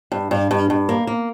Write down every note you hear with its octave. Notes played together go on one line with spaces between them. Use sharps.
G2
G2
G2
G2
A#3
A#3